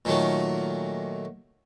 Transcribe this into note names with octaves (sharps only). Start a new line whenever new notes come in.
A#2 D#3 F#3 A3